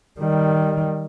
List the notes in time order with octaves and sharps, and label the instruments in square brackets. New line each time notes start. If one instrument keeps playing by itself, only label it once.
[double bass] D#3 G3